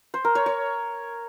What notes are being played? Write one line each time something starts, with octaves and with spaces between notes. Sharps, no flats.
C5
A#4
C#5
C#5